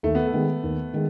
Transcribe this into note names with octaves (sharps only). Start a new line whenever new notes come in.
D#2 A3
B3
A3
D#3 G#3 B3
D#2
D#3 G#3